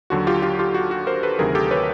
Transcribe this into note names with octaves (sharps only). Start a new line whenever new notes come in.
D#2 D3 F#3 F#4
F4 G4
F4 G4
F4 G4
F#4
F#4
A#4 C5
A4 B4
D2 C3 D#3 F#3 G#4 A#4
G4 A4
B4 C#5